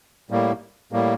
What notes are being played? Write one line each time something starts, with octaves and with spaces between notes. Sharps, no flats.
A2 G3 A#3
A2 G3 A#3